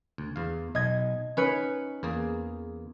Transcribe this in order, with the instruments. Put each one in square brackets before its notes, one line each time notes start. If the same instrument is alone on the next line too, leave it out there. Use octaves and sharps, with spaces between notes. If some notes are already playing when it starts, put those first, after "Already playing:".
[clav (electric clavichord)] D2
E2 F5
[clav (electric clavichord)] B1 [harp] D#5 G#6
[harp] C#4 B4 C#7 [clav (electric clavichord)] D#4
[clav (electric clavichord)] E2 A#3 G#4